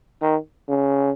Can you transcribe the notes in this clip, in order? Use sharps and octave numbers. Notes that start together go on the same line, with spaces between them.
D#3
C#3